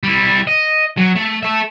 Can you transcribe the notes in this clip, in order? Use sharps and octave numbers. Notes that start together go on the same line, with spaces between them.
G3 E4
D#5
F#3
A3
A4 E5